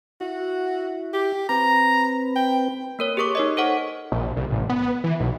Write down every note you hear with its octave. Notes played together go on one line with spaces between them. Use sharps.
E4 F#4
G4
C4 B4 A#5
G5
A#3 A#4 C#5
G4 G#4 A#4 C#6 D6
D#4 C#5 D#5
A4 C5 F#5 C#6
A#1
C2
A1
B3
E3
B1